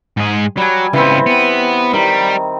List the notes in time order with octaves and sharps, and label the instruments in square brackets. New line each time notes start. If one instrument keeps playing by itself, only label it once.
[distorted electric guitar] G#2 G#4
[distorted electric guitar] F#3 [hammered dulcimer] G3 G#5
[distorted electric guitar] C#2 B3 [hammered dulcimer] E3 C4
[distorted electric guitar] B3
[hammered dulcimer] D#3 [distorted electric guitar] G3